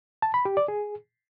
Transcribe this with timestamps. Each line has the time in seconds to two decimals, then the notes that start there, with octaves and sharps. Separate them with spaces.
0.22 A5
0.34 B5
0.45 G4
0.57 D5
0.68 G#4